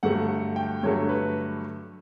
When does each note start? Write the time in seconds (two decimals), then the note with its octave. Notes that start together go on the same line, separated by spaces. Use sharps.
0.03 G2 D3 F#3 A3 F#5
0.56 G5
0.83 G2 D3 F#3 A3 C#5
1.09 B4